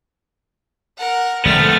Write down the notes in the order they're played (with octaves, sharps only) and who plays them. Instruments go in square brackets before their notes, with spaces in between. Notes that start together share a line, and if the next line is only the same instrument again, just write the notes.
[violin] A#4 F#5
[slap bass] D3 F3 G#3 [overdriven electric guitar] A3 B3 [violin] C4 F6